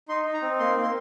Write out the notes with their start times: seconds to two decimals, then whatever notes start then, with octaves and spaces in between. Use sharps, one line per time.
0.08 D#4 C6
0.25 D#4
0.34 A#5
0.42 C4
0.59 A#3 C6
0.76 A#3
0.83 C6